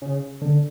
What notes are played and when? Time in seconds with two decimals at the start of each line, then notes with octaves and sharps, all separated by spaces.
0.02 C#3
0.42 D3